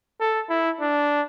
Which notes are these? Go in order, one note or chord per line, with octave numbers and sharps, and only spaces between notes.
A4
E4
D4